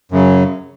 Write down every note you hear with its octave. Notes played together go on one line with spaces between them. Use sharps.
F#2 C#3 F#3